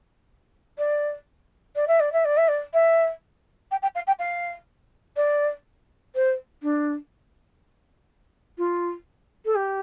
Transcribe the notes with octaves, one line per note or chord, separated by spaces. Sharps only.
D5
D5
E5
D5
E5
D5
E5
D5
E5
G5
G5
F5
G5
F5
D5
C5
D4
F4
A4
G4